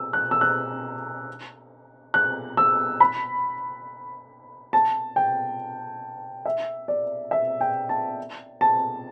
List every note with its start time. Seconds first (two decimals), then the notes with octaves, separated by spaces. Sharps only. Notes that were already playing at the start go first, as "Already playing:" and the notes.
Already playing: E6
0.13 F#6
0.31 E6
0.41 F#6
2.14 F#6
2.57 E6
3.00 B5
4.73 A5
5.16 G5
6.45 E5
6.88 D5
7.31 E5
7.61 G5
7.89 A5
8.61 A5